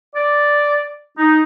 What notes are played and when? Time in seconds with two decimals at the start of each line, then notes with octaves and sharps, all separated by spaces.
0.15 D5
1.18 D#4